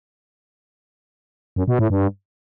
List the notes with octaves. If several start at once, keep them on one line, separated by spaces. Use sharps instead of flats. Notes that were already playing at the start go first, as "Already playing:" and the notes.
F#2
B2
A2
G2